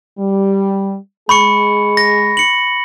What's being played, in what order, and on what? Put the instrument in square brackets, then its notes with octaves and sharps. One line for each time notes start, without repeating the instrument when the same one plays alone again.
[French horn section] G3
[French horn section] G#3 G#4 [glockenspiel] B5 C#6 C#7
[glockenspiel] A#6
C#7 F#7